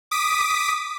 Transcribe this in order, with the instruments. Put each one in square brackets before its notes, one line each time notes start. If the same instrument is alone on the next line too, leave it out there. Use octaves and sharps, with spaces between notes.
[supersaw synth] D6 D#6 B6